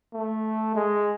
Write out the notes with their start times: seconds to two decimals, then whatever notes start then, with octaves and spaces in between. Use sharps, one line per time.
0.14 A3
0.75 G#3